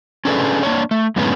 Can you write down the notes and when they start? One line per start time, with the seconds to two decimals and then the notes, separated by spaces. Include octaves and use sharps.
0.25 C#4 D4 G#4 A4 B4
0.63 A#3 D4 C#5
0.91 A3
1.16 F#2 A2 D3 G#3 B3 C#4